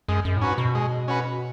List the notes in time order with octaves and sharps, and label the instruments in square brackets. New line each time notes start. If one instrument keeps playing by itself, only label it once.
[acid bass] F#2 [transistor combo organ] G#3
[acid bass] F#2
A2
[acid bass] G#2 [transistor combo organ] C#4 F#4 B4
[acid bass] B2
[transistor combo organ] G#3
C#4 F#4 B4